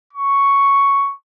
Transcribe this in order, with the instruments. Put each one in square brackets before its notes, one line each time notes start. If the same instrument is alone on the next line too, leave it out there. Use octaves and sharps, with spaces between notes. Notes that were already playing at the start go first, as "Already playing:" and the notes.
[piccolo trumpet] C#6